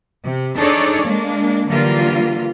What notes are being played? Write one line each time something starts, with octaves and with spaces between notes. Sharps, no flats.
C3
D4 D#4 G#4 A4 C#5 D5
G#3 A#3 D4
D3 E3 F#3 G3 A#3 F4